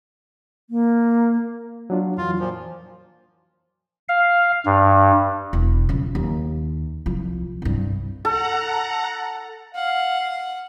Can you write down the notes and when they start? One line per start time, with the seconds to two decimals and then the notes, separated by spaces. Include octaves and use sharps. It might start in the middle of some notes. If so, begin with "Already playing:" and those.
0.70 A#3
1.90 F#3 D4 F4
2.18 F2 E3 F#3 F4
2.39 A#2 F3
4.09 F5
4.66 G2
5.53 E1
5.89 C#3 F3
6.15 D#2
7.06 C2 F3
7.62 C2 G2
8.25 A4 F#5 A#5
9.75 F5 F#5